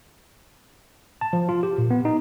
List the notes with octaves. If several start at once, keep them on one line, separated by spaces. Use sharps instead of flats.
A5
F3
F4
G4
A#2
B3
D#4